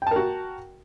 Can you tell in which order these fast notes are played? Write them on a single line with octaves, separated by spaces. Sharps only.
G5 A5 A#4 F#4